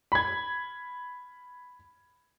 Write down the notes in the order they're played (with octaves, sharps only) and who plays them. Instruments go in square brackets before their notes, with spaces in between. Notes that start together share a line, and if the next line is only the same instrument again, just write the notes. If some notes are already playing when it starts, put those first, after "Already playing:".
[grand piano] B5 G#6